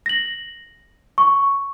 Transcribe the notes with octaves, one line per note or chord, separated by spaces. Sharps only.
A#6 F#7
C#6